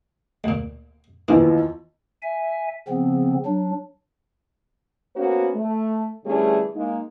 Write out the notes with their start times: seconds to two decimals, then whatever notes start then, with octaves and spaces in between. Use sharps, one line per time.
0.44 D2 A#2
1.28 D#2 B2 E3 F3 A#3
2.23 E5 G#5
2.88 C#3 F3 B3 C4
3.46 F#3 D4
5.16 A#3 B3 C#4 F#4 A#4 C5
5.55 A3
6.25 D3 E3 G3 A3 C#4 G#4
6.75 G#3 A#3 D#4